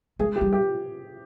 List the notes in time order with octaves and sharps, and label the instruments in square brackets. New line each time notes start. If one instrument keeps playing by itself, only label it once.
[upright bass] G#3 [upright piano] G#4
[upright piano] G4
[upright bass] G3
[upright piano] G4